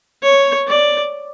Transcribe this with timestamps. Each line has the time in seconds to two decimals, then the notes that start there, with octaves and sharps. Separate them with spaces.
0.23 C#5
0.68 D5